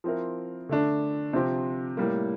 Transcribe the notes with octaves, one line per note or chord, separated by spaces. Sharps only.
F3 C4 E4 A#4
D3 A3 D4
C3 F3 C4 G4
A2 G3 A#3